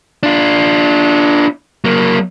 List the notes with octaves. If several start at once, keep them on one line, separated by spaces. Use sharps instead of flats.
D4 F4
F#3 A#3